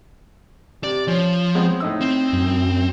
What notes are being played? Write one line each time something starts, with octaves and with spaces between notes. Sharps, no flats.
C3 D5
F3 C#4
G#3 B3 C4
A2 D#4 E6
C4
F#2